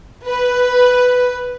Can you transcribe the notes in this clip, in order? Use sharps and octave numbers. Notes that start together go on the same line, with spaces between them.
B4